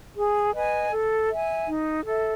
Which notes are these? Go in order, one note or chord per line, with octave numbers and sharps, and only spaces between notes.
G#4
B4 D#5 G#5
A4
E5 G#5
D#4
A4 E5